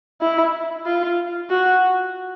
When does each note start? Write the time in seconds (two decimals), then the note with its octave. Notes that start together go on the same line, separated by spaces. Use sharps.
0.21 E4
0.86 F4
1.50 F#4